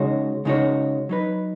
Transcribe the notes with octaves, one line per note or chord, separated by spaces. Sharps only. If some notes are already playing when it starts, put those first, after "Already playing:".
Already playing: C#3 G#3 D#4 F#4 C#5
C#3 G#3 D#4 F#4 C#5
F#3 D#4 B4